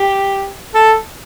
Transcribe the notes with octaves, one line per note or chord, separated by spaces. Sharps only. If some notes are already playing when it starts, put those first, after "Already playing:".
Already playing: G4
A4